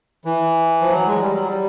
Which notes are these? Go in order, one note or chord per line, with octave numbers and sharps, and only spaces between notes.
E3
F3
F#3
G#3
G3
F#3
G3